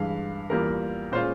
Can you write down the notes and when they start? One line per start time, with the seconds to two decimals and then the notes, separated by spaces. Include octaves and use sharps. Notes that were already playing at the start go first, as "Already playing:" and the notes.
Already playing: G2 E3 G#3 F5
0.50 E2 E3 G3 A#3 F4 A#4
1.12 A#2 G#3 C#4 F4 C5